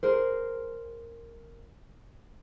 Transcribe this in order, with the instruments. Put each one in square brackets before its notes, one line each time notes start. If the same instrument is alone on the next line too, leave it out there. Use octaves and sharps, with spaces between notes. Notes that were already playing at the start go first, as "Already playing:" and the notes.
[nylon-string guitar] G#4 A#4 C5